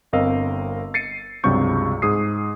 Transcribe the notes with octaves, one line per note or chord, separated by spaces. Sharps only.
G1 C4 A#4 D#5 F5 E6
A6 C7 C#7 D#7
C#2 G2 C3 F#3 C#6 G6
G#2 G#4 D#6 C7